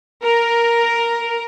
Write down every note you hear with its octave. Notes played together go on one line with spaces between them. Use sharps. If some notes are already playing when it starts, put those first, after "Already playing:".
A#4